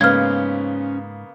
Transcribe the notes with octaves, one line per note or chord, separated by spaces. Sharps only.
G#2 C#3 A#3 B3 C#4 C5 F6 G#6